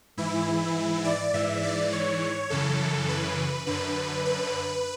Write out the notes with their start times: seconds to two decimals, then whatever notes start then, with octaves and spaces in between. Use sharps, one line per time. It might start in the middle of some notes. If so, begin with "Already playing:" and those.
0.17 G#2 E3 E4
1.05 D5
1.33 G#2 E3 E5
1.63 D5
1.92 C#5
2.50 F#2 C#3 E3 A4
3.09 B4
3.67 F#2 D3 B4
4.25 B4